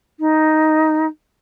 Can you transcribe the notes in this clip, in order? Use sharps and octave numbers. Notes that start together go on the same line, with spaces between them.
D#4